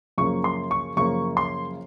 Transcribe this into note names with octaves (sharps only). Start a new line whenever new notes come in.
F#2 C#3 F3 A#3 C#6
C6
C#6
F#2 C#3 F3 A#3 C#6
C6